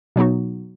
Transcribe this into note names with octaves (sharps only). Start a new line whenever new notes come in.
B2 F#3 B3 D#4 F#4